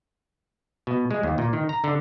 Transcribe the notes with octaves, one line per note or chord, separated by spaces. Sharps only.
B2
G#3
D#2
A#2
D#3
A#5
D3